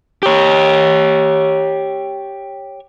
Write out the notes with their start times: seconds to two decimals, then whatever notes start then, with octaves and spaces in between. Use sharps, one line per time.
0.23 G4 C#5